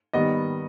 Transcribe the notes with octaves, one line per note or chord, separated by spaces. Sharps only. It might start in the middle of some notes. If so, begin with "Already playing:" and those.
D#3 G3 B3 D#5